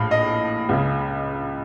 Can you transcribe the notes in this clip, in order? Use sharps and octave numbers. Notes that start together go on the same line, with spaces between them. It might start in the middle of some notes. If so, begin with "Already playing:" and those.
Already playing: A#1 A2 F5
D#5
C#2 C#3